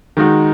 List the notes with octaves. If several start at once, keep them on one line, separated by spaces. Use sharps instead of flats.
D#3 G#3 D#4 F#4